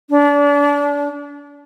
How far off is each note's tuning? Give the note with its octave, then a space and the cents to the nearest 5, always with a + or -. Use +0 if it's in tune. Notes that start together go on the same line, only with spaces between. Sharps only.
D4 -30